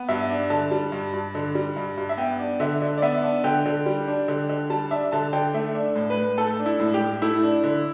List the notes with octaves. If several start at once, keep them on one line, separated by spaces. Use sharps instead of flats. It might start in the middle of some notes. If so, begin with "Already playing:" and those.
Already playing: B3
G2 E5
D4
D3 A5
G3
G2
G2
D3
G3
G2
G2
E5
B3 G5
D4
D3 E5
D3
D5
B3 E5
D4
D3 G5
D3
G3
D4
D3
D3
G3 A5
D4 E5
D3 A5
D3 G5
A3 E5
D4
A2
B4
A2
A3 A4
D4
E4
A2
G4
A2
A3 E4
D4
D3